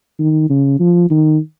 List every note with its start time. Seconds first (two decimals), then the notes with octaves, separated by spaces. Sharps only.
0.19 D#3
0.49 C#3
0.80 F3
1.10 D#3